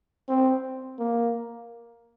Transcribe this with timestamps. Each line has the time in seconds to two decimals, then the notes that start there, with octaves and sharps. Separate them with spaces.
0.29 C4
0.99 A#3